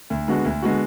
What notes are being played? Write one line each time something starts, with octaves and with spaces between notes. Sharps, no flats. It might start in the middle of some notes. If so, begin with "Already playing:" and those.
D2
D3 G#3 B3 F#4
D2
D3 G#3 B3 F#4